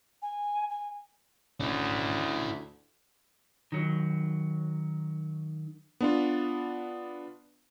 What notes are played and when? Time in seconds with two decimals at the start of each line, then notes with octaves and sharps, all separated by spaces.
0.22 G#5
0.70 G#5
1.60 D2 C#4 E4
3.72 D#3 F#3
6.01 B3 D4 F4